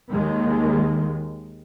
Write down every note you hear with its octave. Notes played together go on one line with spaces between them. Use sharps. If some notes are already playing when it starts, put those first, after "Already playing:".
D#2 D#3 G#3